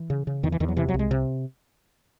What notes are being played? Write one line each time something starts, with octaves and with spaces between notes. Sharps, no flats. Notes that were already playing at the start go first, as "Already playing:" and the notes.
Already playing: E3
C#3
C#3
E2 D#3
E3
E2 D#3
F#3
C3 E3
F#3
C2
G#3
C3